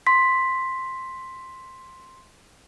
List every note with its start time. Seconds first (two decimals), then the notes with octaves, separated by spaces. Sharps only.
0.07 C6 B6